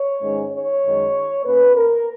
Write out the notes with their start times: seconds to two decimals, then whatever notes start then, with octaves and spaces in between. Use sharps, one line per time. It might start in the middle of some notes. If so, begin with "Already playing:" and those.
Already playing: C#5
0.21 G#2 D#3 G#3 C#4
0.51 C#5
0.83 F#2 D#3 G#3
1.45 B2 A#3 C#4 B4
1.75 A#4